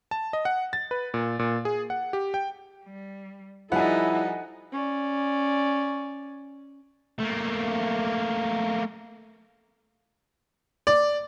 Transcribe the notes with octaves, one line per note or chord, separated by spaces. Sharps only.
A5
D#5
F#5
A6
B4
A#2
A#2
G#4
F#5
G4
G5
G3
F3 G3 D#4 E4 A4 F#5 G#5
C#4 D5
A3 A#3
D5